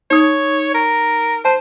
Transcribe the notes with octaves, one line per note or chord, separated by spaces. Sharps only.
D#4 C#5 D#6
A#4
C5 A5